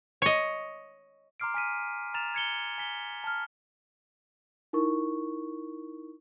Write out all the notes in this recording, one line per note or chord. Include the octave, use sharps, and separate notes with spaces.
C#5 D#5
A#5 C6 D6 F6 C7 D7
G#5 F6 B6 D#7
A#5 F6 A6 E7 F7
G#6 C#7 G7
G#5 B6 G7
A5 F6
D#4 E4 A#4 C#6